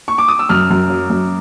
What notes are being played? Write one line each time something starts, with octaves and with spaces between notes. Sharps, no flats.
C#6
D6
D#6
E6
F#2 F6
F#2
F#3
F#2